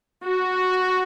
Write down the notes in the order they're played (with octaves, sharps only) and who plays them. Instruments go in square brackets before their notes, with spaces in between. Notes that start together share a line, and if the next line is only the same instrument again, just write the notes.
[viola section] F#4